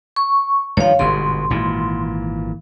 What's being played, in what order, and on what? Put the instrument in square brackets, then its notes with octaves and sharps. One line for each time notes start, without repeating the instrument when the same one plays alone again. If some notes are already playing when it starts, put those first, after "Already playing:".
[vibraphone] C#6
[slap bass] G2 D#3 F3 [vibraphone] C#5 F5
[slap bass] G1 G#2 B2 [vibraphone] C6
[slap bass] G#1 A#2 E3